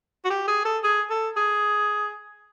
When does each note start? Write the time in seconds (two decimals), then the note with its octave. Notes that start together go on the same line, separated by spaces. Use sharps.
0.25 F#4
0.30 G4
0.48 G#4
0.65 A4
0.84 G#4
1.10 A4
1.37 G#4